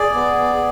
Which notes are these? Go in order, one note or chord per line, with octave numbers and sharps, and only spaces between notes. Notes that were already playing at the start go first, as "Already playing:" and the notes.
Already playing: G#4 D5
B3
G#4